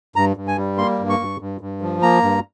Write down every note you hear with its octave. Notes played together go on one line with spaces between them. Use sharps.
G2 A#5
G2
G#5
G3
A#3 C6
G2
C#6
G2
G2
G2
F3
A#3 A#5
G2